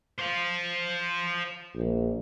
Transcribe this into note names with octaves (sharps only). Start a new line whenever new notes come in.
C5 F5
A#1